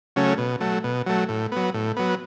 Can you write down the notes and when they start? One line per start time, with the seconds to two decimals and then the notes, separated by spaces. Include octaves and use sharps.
0.16 C#3 F#3 A3 C#4
0.38 B2
0.60 F#3 A3
0.84 B2
1.06 F#3 A3
1.29 A2
1.52 F#3 B3
1.74 A2
1.96 F#3 B3